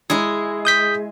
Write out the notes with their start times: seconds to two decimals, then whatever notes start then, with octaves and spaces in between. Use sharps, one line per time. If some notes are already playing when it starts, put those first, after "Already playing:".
0.10 G#3 E4 G#4
0.65 D#6 G6 B6